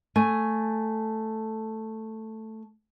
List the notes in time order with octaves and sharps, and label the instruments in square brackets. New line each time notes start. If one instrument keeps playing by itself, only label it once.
[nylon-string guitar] A3 G#5